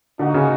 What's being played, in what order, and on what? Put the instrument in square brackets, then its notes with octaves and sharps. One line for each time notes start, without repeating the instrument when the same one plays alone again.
[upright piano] D3 [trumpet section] A#3 D#4 F#4
[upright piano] C#3